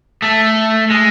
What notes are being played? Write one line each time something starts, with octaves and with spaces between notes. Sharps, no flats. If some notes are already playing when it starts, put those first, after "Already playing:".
A3
G#3